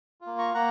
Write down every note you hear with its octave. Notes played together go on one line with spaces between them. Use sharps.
F4
A#3
A#5 C#6
A#3 F#5 A#5